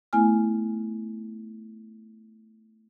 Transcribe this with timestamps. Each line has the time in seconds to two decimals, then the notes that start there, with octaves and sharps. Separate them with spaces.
0.13 A3 B3 E4 G#5 F6